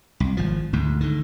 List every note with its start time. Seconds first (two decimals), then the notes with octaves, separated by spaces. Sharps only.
0.20 C2
0.37 G#1 F3
0.73 D2 G#2
1.01 D3 D#3